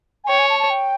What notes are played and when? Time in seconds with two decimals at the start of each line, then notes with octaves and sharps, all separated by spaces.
0.24 G#5
0.28 C#5 G5
0.39 G#5
0.49 A5
0.60 A5
0.70 G5